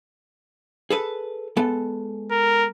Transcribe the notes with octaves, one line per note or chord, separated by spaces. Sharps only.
G#4 A4 B4
G#3 B3 A4
A#4